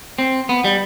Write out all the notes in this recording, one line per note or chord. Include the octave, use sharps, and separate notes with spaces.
C4
B3
G3